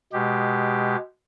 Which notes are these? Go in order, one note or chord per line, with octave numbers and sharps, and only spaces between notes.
B2 G#3 G4